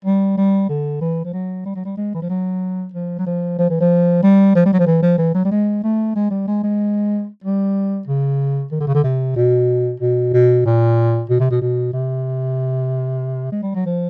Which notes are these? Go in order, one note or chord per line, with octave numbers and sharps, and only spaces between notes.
G3
G3
D3
E3
F3
F#3
G3
F#3
G3
G#3
E3
F3
F#3
F3
F#3
F3
F3
E3
F3
G3
F3
G3
F#3
F3
E3
F3
E3
F#3
G3
G#3
A3
G#3
G3
G#3
G#3
G3
C#3
D#3
D3
C#3
D3
C3
B2
B2
B2
A#2
B2
C3
B2
B2
C3
G#3
G3
F#3
F3